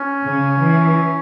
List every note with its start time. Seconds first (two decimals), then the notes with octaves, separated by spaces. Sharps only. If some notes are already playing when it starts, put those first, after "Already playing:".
Already playing: C#4
0.23 C#3
0.59 E3